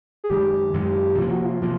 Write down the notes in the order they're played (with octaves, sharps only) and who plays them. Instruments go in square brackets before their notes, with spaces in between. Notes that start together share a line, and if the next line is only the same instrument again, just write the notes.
[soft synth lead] G#4
[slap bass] F#2 D#3 G#3 [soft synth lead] G4
[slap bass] F#2 D#3 G#3
[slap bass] C3 F3 A#3 [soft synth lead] F4
[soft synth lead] F#4
F4
[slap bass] C3 F3 A#3